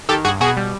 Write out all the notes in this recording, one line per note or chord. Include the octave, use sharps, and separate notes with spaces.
D#3 G4 A4
G2 F#4 G#4
B2 F#4 G#4
G3